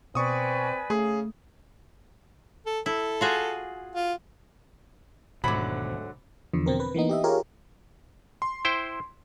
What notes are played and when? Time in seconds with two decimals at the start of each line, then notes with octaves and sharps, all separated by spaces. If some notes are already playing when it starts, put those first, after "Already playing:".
0.15 B2 C4 B4 D5 G#5 C#6 D#6
0.90 C#3 A3 G#4
2.66 A4
2.86 E4 A4
3.21 F4 F#4 G#4
3.95 F4
5.44 E1 D2 G#2 B2 D3 D#3 F#3 B5
6.53 E2 D3 F3
6.66 B2 C4 A#4
6.80 B4
6.94 E3 A#3 B3 D#4
7.09 G4 D#5 E5
7.24 F4 G4 G#4 A#4 C#5
8.42 C6
8.65 E4 C5 G5